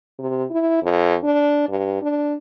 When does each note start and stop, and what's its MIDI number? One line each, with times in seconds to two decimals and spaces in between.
0.19 0.44 48
0.51 0.82 64
0.83 1.17 41
1.24 1.64 62
1.69 2.00 43
2.02 2.36 62